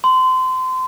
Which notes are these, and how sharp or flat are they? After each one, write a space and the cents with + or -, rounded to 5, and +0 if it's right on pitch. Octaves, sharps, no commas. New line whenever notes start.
C6 -30